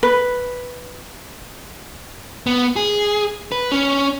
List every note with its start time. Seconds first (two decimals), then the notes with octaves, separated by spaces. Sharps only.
0.03 B4
2.47 B3
2.76 G#4
3.52 B4
3.72 C#4